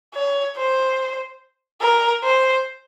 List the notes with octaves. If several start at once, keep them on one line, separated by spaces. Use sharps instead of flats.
C#5
C5
A#4
C5